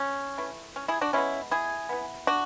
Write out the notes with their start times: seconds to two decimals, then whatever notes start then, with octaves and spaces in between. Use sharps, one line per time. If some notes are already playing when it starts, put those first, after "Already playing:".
Already playing: C#4
0.38 E3 A3
0.76 C#4
0.88 E4 G#4
1.01 D4 F#4
1.13 D3 G#3 B3 C#4 E4
1.51 E4 G#4
1.89 E3 B3
2.27 D4 F#4